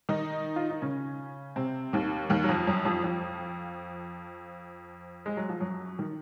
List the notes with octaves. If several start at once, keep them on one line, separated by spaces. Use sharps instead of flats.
D#3 D#4
F4
D#4
C#3 C#4
C3 C4
D#2 D#3
D#2 D#3
F#3
F2 F3
F#2 F#3
F2 F3
F2 F3
G#3
F#3
F3
F#2 F#3
D#3